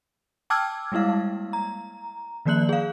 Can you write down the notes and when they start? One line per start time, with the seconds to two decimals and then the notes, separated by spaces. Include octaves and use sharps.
0.50 G5 A5 D6 E6 F6 G#6
0.92 G3 G#3 A#3 E4 F5
1.53 A#5
2.46 D#3 F3 A#3 D5 F#6 F#7
2.69 G#4 F5